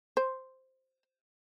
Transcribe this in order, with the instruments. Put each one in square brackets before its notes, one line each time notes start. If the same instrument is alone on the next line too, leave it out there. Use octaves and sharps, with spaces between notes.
[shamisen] C5